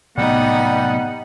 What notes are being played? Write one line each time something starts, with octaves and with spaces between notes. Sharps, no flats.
A2 C3 F#3 G3 B3 D#4 F#5